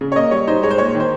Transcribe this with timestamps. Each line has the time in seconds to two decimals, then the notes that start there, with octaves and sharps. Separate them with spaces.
0.01 C#3
0.12 C#5
0.16 A#3 D#5
0.31 G3 C#5
0.47 D#4 C5
0.63 G#3 C#5
0.71 C5
0.78 A#2 C#5
0.94 D#3
1.00 C5